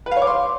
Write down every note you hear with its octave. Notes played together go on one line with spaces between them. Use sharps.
B4
F5
C#5
D6
C6